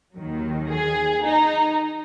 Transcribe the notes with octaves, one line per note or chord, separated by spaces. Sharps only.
D#2 D#3 F#3
G#4
D#4